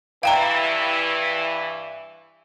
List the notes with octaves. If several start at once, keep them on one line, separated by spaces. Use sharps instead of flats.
G2 E3 F5 G5 A#5